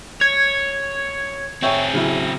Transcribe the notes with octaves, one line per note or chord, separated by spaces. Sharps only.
C#5 G#6
C4 G#4 C#5 E5 G5
C#3 F#3 E4